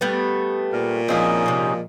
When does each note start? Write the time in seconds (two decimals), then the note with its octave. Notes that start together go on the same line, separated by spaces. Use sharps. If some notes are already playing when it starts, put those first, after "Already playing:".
0.01 G3 A3 B3
0.73 A#2 F5
1.09 F3 G#3 C4 C#4 D#4 E4 D#5
1.46 C3 A#3